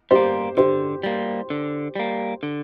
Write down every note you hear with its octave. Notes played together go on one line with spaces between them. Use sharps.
G3 A#3 G4 C5
D3 G4 C5
G3 A#3
D3
G3 A#3
D3